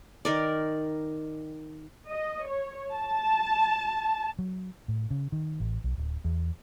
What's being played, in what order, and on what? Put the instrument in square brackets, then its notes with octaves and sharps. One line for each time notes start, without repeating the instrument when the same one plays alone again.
[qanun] D#3 A#4 D5
[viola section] D#5
C#5
A5
[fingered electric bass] F#3
A2
C#3
D#3
A1
B1
D1
E2